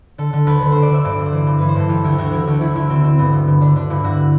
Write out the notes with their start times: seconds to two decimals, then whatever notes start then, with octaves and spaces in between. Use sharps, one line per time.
0.18 D3 A4
0.33 D3
0.47 D2 B4
0.61 D3
0.72 D2 C5
0.82 D5
0.90 D3 E5
1.05 G2 D5
1.19 G2
1.26 C5
1.33 E3
1.47 G2
1.58 E3 B4
1.69 C5
1.76 G2 A4
1.89 E3 G4
2.04 D2 E4
2.18 D2 F#4
2.32 E3 E4
2.47 D2
2.61 E3 E4
2.75 D3 E4
2.90 D3 C4
3.04 D3 C4
3.19 G2 B3
3.33 G2
3.47 D3
3.61 D3 D4
3.76 D3 D4
3.90 G2 E4
4.04 G2 F#4